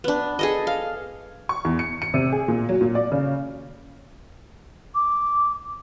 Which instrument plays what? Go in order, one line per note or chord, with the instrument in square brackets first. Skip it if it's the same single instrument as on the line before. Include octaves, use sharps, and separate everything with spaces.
[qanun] B3 D4
G#4 A4 D#5
F5
[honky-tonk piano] C#6
E2
C#7
C#7
C3
G#4
A#2
F#3
A#2
D5
C#3
[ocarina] D6